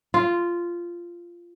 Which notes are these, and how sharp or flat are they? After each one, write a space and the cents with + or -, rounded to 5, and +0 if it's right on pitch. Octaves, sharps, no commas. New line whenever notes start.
F4 -10